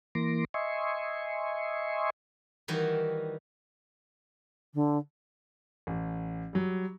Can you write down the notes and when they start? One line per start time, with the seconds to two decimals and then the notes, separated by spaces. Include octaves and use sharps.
0.15 E3 A#3 C6 D6 A#6
0.54 D#5 E5 G#5 C6 C#6
2.68 D#3 E3 G3 F#4
4.74 D3
5.87 A1
6.53 F#3 G3